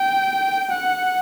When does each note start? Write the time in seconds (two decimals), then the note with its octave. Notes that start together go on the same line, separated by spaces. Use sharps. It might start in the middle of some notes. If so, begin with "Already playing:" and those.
Already playing: G5
0.70 F#5